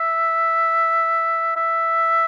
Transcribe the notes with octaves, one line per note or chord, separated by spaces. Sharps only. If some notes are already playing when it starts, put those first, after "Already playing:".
Already playing: E5
E5